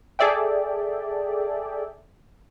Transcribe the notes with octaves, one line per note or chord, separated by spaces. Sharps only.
G#4 A4 D5 E5 G5